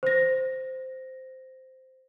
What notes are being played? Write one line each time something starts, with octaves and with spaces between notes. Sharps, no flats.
C5 A#6